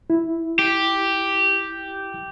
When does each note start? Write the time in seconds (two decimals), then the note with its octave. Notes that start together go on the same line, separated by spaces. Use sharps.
0.10 E4
0.59 G4